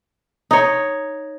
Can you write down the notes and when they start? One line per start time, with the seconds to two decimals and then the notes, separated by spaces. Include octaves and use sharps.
0.51 D#4 C#5